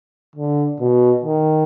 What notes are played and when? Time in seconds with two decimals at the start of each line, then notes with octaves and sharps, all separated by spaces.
0.36 D3
0.80 B2
1.24 D#3